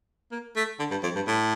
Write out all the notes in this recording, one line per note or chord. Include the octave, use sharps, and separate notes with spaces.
A#3
A3
D3
G2
F2
G2
A2